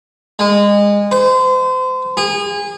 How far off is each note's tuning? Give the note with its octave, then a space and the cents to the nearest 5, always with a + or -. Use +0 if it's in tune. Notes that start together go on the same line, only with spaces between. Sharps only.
G#3 -25
C5 -35
G#4 -30